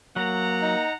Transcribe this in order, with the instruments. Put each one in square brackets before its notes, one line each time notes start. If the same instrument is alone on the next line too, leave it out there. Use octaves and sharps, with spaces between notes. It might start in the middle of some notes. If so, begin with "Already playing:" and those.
[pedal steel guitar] F#3 [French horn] A#3 [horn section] F#5 A#5
[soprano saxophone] D#4